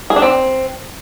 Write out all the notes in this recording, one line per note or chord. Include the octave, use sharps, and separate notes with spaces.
G#4
D4
C4